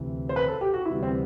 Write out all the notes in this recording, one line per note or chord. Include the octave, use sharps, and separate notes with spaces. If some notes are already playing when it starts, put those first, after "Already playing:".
Already playing: D2 C3 E3
C5
B4
A4
G4
F#4
D2 C3 E3 G3 B3 E4
C4